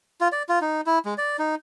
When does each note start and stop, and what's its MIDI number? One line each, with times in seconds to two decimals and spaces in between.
0.21 0.28 65
0.32 0.43 74
0.49 0.59 65
0.61 0.81 63
0.86 0.99 64
1.05 1.14 56
1.18 1.37 74
1.39 1.55 63